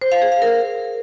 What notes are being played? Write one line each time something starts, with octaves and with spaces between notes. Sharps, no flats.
C5
F5
G#4
F5
A#4